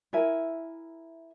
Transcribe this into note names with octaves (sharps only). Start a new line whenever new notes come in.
E4 A#4 E5 G#5